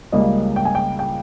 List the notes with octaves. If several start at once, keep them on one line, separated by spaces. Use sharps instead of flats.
C#2 C#3 G3 A#3 D#5
G5
G#5
G5
G5